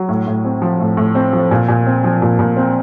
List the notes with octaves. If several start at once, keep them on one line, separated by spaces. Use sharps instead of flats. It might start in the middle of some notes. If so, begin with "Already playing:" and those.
Already playing: F#3
A2
A2
C4
F3
A2
A2
C4
F3
A#2
A#2
C4
F3
A#2
A#2
C4